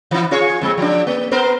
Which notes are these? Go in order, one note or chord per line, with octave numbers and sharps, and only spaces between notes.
E3 E4
F4 G#4 C#5
F2 G#3
F3 D4
A#3
B3 A#4 C5